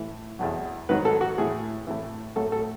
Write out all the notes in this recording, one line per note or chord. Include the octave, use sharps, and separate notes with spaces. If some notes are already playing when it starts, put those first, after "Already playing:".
Already playing: A2 E3
E2 B2 F#3
G#2 D#3 F#3 B4
A4
F#4
A2 E3 G#4
A2 E3
A2 F#3 A4
A4